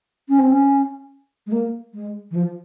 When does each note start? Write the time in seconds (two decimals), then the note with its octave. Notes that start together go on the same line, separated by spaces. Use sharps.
0.29 C#4
0.39 C4
0.51 C#4
1.47 G#3
1.52 A#3
1.94 G#3
2.31 E3
2.36 F3